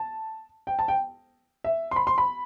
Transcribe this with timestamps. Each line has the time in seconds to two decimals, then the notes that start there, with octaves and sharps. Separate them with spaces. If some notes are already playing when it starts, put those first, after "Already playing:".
Already playing: A5
0.67 G5
0.79 A5
0.88 G5
1.64 E5
1.91 C6
1.96 B5
2.07 C6
2.18 B5